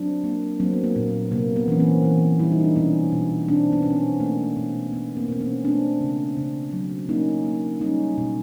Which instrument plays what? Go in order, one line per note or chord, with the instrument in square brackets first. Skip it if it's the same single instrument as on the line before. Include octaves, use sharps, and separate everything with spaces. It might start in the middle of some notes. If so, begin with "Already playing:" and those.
Already playing: [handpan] F#3 C4 D4
A#3
F#3 A#3 C4
B3
A#3
A#2
B3
C3 A#3
B3
E3 C#4
A#3 C4
E3
G3 E4
D#4
D4
B2 B3 C#4
B2
B2 C4 D4
B3 C#4
B2 C#4
C4
B3
A3 A#3
B2
B2 B3
A#3 C4
B2 C4
B3 C#4
A3 C4 D4
C#3
C#3
F#3
A#3 C#4 D#4
A#3
G3 C#4 D#4
B2